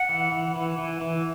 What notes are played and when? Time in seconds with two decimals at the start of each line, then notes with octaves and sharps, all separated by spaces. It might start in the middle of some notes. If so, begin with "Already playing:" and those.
Already playing: F#5
0.09 E3
0.32 E3
0.56 E3
0.78 E3
1.01 E3